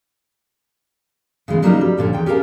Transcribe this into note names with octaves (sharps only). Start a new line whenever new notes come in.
C#3 E3 G#3 B3
C#3 F#3 G3 A#3 C4 D#4
G3
F2 A#2 D3 C#4
E2 G5
C#4 G4 G#4 A#4 F5 A5